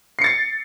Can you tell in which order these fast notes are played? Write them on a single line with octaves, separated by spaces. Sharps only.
C7 C#7 A6